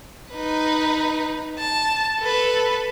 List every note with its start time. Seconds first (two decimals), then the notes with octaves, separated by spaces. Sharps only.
0.32 D#4 B4
1.58 A5
2.19 A4 B4